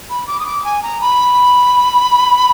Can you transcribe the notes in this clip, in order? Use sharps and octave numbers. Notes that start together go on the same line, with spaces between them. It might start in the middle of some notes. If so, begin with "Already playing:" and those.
B5
D6
D#6
D6
G#5
A#5
B5